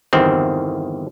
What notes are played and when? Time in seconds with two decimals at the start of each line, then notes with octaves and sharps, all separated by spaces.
0.13 G1 E2 D#3 C4